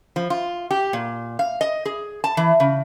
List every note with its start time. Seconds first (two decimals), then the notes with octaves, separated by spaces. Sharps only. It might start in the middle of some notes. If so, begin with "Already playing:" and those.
0.16 F3
0.30 F4
0.71 G4
0.93 A#2
1.39 F5
1.61 D#5
1.85 G#4
2.24 A5
2.37 E3
2.60 C#3